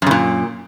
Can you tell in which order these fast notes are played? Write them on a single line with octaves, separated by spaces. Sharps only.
F#2 C#3 A#2